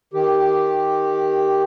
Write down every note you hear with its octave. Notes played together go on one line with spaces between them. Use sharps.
D#3 G4